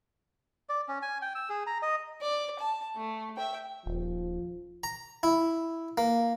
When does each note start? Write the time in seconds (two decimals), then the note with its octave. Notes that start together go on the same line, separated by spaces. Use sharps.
0.69 D5
0.88 C#4
1.02 G#5
1.22 G5
1.35 E6
1.50 G#4
1.67 A#5
1.82 D#5
2.22 D5
2.59 A5
2.96 A3
3.37 E5 G5
3.86 D#1 F3
4.84 A#5
5.23 E4
5.98 A#3